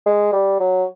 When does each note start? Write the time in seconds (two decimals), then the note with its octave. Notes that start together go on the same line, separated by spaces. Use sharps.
0.06 G#3
0.33 G3
0.60 F#3